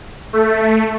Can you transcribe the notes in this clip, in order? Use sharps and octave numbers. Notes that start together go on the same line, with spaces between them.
A3